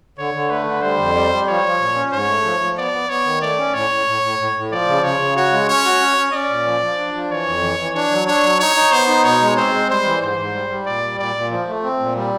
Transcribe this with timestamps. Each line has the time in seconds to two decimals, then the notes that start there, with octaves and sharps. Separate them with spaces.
0.18 D3 C#5
0.34 D3
0.50 A3 B4
0.67 D3
0.82 G3 C5
0.99 F2
1.15 G3
1.32 G3
1.48 F3 C#5
1.64 F3
1.80 A#2
1.96 C#4
2.13 G#2 C#5
2.28 A3
2.44 F3
2.61 F3
2.77 B3 D5
2.93 B3
3.10 B3 C#5
3.25 D#3
3.42 A3 D5
3.58 C#4
3.74 A2 C#5
3.90 A2
4.07 A2
4.23 A2
4.39 A2
4.55 A2
4.72 F3 D5
4.88 C#3
5.04 C#3 C#5
5.20 C#3
5.36 F#4 C#5
5.52 G#3
5.68 C#4 C#5
5.85 F#4
6.00 C#4
6.17 C#4
6.33 C#4 D5
6.49 A#2
6.66 F3
6.82 F3
6.98 D4
7.14 F3
7.30 E3 C#5
7.47 F2
7.63 E3
7.79 E3
7.95 D4 C#5
8.11 F#3
8.27 D4 C#5
8.43 F#3
8.60 D#4 C#5
8.76 D#4
8.92 B3 C5
9.08 D#4
9.24 B2 C#5
9.41 G#3
9.57 C4 C5
9.74 G#3
9.89 G3 C5
10.05 E3
10.21 G#2 C5
10.38 G#2
10.54 G3
10.70 G3
10.86 A#2 D5
11.03 G3
11.19 A#2 D5
11.35 A#2
11.51 F3
11.68 A3
11.83 C4
12.00 A#2
12.16 G3